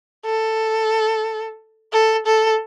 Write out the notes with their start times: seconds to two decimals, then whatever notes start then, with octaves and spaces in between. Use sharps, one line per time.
0.25 A4
1.93 A4
2.26 A4